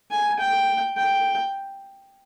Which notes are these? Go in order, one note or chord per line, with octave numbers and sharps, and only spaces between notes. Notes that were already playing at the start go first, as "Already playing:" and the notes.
G#5
G5
G5